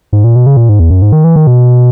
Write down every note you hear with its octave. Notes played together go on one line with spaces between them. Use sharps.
G#2
A#2
B2
C#3
A#2
G#2
E2
F#2
G#2
D#3
E3
D#3
B2